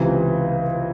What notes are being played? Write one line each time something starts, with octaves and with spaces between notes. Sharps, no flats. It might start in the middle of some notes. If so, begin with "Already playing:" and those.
Already playing: C#2 C3 E3